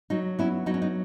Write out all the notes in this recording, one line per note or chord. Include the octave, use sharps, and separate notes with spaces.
F#3 D#4
B3 C#4 E4
F#3 D#4
C#4
D#4